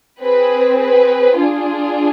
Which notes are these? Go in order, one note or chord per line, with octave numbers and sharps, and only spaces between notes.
C4 G#4 B4
B4
D4 F4 G#4